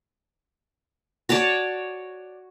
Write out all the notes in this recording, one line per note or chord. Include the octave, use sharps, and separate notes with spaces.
F#4 C#5 D5 A5